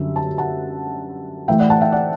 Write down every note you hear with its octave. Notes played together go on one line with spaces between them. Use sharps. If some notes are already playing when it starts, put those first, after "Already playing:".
Already playing: F#2 D3 G3 E5
A5
F#5 A5
A2 E3 A3 E5 G5
D5 F#5
F#5 A5
E5 G5
D5 F#5